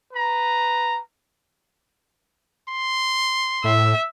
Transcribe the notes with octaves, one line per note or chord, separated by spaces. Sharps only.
B4 A#5
C6
A2 E5